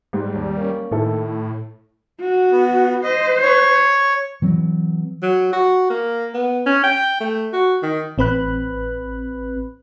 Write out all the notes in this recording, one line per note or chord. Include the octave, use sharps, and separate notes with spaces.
G#2 G3
D#2
A#3 C#4
A2 D#3 E4 A4
F#4
B3
C5 D#5
C#5
E3 F#3 C4
F#3
F#4
A#3
B3
C#4
G5
A3
F#4
D#3
A1 C4 B4 B5 F#6